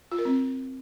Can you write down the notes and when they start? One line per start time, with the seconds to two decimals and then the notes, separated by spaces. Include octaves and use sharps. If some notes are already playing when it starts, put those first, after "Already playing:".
0.12 F4
0.18 A#4
0.25 C4